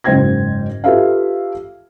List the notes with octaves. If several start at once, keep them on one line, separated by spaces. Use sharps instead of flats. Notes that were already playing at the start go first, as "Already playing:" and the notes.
F#1 G#2 C5 G5 G#6 A#6
F4 G4 A4 B4 E5 F5